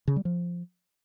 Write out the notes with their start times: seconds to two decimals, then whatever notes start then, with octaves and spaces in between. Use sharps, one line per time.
0.08 C#3
0.16 G3
0.25 F3